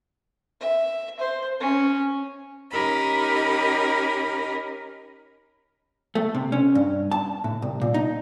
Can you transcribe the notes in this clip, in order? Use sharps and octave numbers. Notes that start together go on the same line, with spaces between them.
E5
C5
C#4
C#4 D#4 G4 A#4 D#5 B5
A3
C3
C#4
G2
A5
A2
C2
A#2
D#4